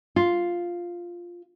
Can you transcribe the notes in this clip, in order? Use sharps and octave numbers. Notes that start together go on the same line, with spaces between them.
F4